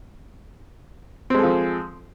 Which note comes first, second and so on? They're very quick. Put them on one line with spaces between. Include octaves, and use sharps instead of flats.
C4 G#3 A4 F3